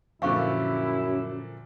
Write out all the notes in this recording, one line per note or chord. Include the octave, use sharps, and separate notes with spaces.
F#2 A#2 D3 F3 E4 F5 C#6